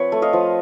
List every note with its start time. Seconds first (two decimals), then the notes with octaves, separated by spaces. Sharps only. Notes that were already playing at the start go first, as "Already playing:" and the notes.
Already playing: F3 C4 B4 C#5
0.12 A3
0.22 D#5 F5
0.33 F3